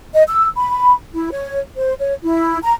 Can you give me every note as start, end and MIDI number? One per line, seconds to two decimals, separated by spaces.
0.13 0.23 75
0.28 0.46 88
0.56 0.93 83
1.13 1.29 64
1.31 1.59 73
1.77 1.93 72
1.99 2.14 73
2.23 2.57 64
2.62 2.73 82